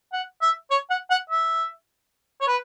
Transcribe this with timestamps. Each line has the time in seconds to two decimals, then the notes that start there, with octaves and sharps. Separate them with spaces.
0.13 F#5
0.42 E5
0.71 C#5
0.90 F#5
1.10 F#5
1.30 E5
2.41 C#5
2.47 B4